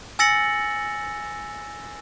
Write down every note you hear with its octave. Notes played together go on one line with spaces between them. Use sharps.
G#5 E6 A6 A#6 C#7 F#7